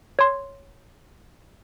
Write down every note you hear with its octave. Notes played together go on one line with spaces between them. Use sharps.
C#5 C6